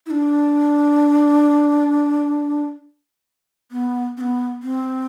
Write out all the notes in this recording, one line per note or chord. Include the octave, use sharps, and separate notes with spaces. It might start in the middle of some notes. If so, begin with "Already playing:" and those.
E4
D4
B3
C4
B3
C4